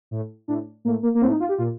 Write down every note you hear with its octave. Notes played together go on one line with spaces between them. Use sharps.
A2
A2 D4
A2 A#3
A#3
A#3
A2 C4
D#4
F4
G4
A#2 F4